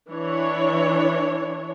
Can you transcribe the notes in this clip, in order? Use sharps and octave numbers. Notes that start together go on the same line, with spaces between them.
E3 D4 C#5